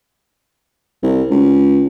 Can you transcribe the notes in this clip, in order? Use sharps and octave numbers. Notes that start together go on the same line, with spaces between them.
C2
C#2